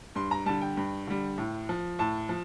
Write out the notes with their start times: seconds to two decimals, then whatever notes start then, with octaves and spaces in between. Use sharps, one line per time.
0.15 G2 C6
0.31 A#5
0.46 D3 G3 A5
0.62 G5
0.77 G2
1.07 D3 G3
1.38 A2
1.69 F3
1.99 A2 A5
2.29 F3